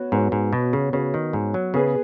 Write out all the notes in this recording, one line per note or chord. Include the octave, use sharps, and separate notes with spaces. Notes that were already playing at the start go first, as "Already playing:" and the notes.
Already playing: B3 F#4 C#5
G#2 B3 F#4 C#5
G#2
B2
C#3
C#3 B3 F#4 C#5
D#3
G#2
F#3
C#3 B3 G#4 B4